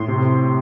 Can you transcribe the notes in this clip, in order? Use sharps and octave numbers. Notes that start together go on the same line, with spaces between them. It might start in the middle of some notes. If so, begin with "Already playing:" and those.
Already playing: A2 C6
C3